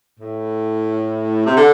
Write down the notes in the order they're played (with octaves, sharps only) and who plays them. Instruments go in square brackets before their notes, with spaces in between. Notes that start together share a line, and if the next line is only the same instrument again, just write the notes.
[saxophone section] A2
C3
D3